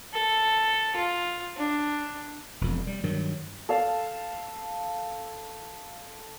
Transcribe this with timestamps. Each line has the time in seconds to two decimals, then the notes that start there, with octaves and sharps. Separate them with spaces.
0.13 A4
0.96 F4
1.57 D4
2.61 E1 F2
2.87 G3
3.03 G2 D#3 F#3
3.69 A4 F5 A5